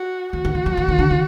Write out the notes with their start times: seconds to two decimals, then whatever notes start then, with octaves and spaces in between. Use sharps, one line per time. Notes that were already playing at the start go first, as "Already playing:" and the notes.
Already playing: F#4
0.33 E3 F#4
0.45 D#3
0.55 E3
0.66 F3
0.77 E3
0.88 D#3
0.99 D3
1.11 D#3